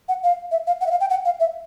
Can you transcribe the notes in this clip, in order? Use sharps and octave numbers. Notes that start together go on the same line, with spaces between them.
F#5
F5
E5
F5
F#5
E5
F5
G5
F#5
F5
E5